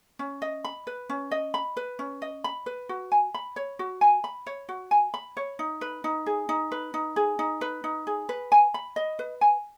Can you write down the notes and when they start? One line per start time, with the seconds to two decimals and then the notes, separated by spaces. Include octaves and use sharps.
0.19 C#4
0.42 D#5
0.65 B5
0.87 B4
1.09 C#4
1.31 D#5
1.54 B5
1.77 B4
1.99 C#4
2.22 D#5
2.44 B5
2.66 B4
2.89 F#4
3.12 G#5
3.34 B5
3.56 C#5
3.79 F#4
4.01 G#5
4.24 B5
4.47 C#5
4.69 F#4
4.91 G#5
5.14 B5
5.37 C#5
5.59 D#4
5.81 B4
6.04 D#4
6.26 G#4
6.49 D#4
6.72 B4
6.94 D#4
7.16 G#4
7.39 D#4
7.61 B4
7.84 D#4
8.07 G#4
8.29 B4
8.52 G#5
8.74 B5
8.96 D#5
9.19 B4
9.41 G#5